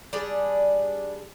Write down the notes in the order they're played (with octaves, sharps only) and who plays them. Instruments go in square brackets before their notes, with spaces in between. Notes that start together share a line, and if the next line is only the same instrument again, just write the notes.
[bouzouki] G3 D4 G#4